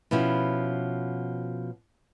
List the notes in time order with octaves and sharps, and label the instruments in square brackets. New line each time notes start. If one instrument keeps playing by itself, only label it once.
[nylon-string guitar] B2 F3 C#4 E4